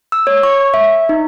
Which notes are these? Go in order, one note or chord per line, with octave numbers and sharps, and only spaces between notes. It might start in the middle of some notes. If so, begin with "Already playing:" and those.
E6
C#5
C#6
E5
D#4